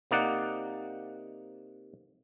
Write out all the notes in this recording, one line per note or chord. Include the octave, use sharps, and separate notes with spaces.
C3 A#3 D#4 D5 F#5